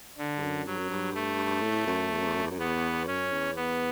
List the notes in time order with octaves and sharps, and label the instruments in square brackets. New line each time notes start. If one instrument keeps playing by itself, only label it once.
[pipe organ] D3
[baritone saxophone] G2
F#2
[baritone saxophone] G2 [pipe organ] F#3
[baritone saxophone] F#2
G2
[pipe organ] A3
[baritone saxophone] A2
F#2
E2
F#2
E2
F#2
E2
F#2
[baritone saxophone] E2 [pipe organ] B3
[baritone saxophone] F#2 [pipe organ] C#4
[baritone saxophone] E2
[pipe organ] B3